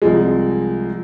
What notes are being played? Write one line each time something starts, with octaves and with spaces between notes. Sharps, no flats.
C2 F3 G#3